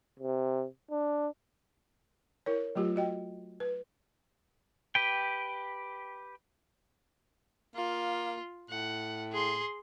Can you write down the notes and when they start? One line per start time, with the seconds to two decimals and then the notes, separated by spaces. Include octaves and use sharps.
0.20 C3
0.91 D4
2.46 E4 A#4 C#5
2.75 F#3 A3 F4 G4
2.96 F#4 D#5 G5
3.60 B4
4.95 G4 B4 G5
7.76 A#3 F4
8.70 A2 F#5
9.33 G#4 C6